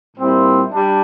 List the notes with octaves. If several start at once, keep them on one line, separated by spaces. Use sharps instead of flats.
A#2 G3 C4 E4
G3 D4